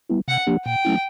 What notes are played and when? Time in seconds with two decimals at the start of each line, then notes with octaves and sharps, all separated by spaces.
0.10 G3 B3 E4
0.28 C3 F#5
0.47 F3 A#3 D4 G4
0.66 A#2 G5
0.85 F#3 A3 C#4 E4